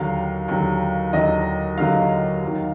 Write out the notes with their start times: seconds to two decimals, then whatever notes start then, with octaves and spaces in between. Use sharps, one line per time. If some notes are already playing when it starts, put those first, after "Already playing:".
Already playing: D#2 D3 F#3 F5
0.48 D#2 D3 F#3
1.13 D#2 D3 F#3 D#5
1.78 D#2 D3 F#3 F5
2.43 D#2 D#3 F#3